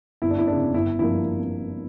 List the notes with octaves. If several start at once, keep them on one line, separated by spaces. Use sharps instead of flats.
G1 E4
D4
E4
F2 C#3 D4
G1 E4
G2 F3 A#3 E4